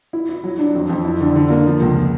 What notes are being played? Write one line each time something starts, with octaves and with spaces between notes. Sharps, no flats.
E4
E4
F#3
D4
F2
F2
E4
D3
D3
A#3
F3
C#2